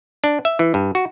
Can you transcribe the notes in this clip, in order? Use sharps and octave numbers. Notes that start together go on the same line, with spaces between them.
D4
E5
E3
G2
F#4